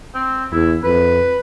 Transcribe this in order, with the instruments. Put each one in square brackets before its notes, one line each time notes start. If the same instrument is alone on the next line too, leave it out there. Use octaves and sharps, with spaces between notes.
[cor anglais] C4
[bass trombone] E2 [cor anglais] E4
[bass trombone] F2 [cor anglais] B4